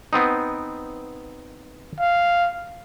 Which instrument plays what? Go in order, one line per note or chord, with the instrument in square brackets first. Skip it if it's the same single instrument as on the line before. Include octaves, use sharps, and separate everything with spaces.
[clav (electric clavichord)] B3 C4 D#4
[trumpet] F5